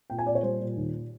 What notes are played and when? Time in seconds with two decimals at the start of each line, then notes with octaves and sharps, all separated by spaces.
0.10 A#2 G5
0.19 G#5
0.27 A#2 D5
0.35 C#5
0.43 G3 C5
0.60 A#2
0.77 D#2